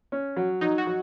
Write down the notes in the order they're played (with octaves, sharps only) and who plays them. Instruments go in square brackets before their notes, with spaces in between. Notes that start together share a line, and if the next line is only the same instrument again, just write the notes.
[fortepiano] C#4
F#3
[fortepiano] F#3 [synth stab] D#4
[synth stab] F#4
[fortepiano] F#3